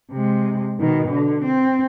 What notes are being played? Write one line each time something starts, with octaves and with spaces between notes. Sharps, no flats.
C3 G#3
B2 D#3
D3
C4